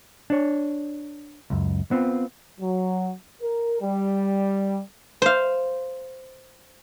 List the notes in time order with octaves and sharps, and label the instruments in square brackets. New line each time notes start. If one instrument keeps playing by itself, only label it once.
[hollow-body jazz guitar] D4 C#5
C#2 F#2
B3 C4 F4
[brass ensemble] F#3
A#4
G3
[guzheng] C5 F5